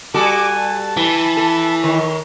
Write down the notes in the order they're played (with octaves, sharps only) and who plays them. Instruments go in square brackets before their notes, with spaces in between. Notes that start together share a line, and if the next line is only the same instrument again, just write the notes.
[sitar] G3 F#4 A4 [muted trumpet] G#5 [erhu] D6
[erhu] A5
[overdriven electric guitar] E3 [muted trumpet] B5
[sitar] A4
[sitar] D#3 [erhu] C#5